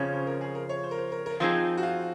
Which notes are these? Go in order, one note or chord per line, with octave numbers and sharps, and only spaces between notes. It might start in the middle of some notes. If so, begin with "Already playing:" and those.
Already playing: F2 C#3 F3 C#4 C#5
C5
A#4
G#4
A#4
C#5
C5
A#4
C5
A#4
A#4
F3 C4 D#4 F4 G#4
F#4
F4